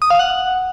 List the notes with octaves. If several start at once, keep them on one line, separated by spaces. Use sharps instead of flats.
D#6
F5
F#5